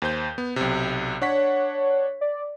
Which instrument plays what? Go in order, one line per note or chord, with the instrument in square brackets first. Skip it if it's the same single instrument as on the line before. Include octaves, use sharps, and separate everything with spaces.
[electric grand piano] D#2 C5 G6
B3
B1 C3
[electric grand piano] D4 F#5 B6 [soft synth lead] C#5
[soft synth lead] D5